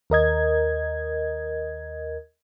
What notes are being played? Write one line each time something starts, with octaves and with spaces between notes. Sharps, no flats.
D#2 A#4 D#5 G#6